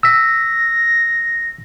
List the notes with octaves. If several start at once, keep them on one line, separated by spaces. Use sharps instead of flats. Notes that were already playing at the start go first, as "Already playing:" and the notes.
E6 A#6 B6